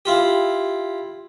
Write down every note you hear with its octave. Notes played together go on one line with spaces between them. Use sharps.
E4 F4 G4